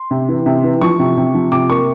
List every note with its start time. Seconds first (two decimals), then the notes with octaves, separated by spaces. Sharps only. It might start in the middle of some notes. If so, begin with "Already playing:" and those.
Already playing: C6
0.11 C3
0.29 E3
0.46 C3
0.64 E3
0.81 F3 C#6
0.99 C3
1.17 C3
1.34 F3
1.52 C3 D6
1.70 A#3 C#6